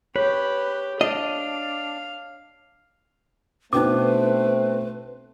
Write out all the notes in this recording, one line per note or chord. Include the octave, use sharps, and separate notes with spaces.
G4 B4 C#5
D4 D#5 F5
B2 A3 C4 D4 D#4 B4 G5 D6